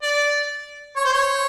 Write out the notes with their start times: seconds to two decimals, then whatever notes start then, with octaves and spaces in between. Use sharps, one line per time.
0.03 D5
0.96 C#5
1.05 C5
1.13 C#5